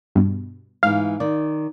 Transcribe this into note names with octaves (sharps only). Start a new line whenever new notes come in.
G2 B2
G#2 E3 F5
D#3 D5